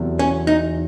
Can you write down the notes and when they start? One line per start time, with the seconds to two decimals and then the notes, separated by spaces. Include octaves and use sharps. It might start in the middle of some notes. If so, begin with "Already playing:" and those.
Already playing: E2 C3 F#3 A3
0.19 C#4
0.47 D#4